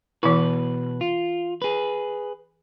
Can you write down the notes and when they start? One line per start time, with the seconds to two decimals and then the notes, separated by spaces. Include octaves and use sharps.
0.23 B2 E3 E4 B4
1.01 F4
1.62 G#4 B4